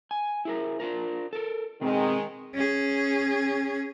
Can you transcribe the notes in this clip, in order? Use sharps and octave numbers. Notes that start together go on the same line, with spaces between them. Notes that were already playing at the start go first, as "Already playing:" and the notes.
G#5
E4 G#4 A#4
D4 F4 A#4
A4 A#4
B2 D#3 G#3 C4
C#4 G#4